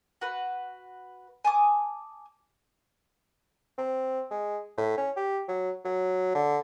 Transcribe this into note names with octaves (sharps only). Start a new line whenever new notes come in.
F#4 B4
G#5 A5 D6 D#6
C4
G#3
A2
C#4
G4
F#3
F#3
D3